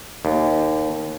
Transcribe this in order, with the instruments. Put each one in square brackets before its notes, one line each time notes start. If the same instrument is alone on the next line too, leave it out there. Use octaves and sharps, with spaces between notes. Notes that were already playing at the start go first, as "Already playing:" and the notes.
[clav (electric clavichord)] D#2